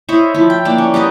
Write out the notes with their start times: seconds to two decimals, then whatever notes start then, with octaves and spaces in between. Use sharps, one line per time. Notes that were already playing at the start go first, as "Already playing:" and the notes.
0.09 E4 C5 C#5 D#5
0.34 F3 E4
0.50 G5
0.65 A#3 D4 G5
0.78 C#4
0.94 G3 B3 A#4 D#5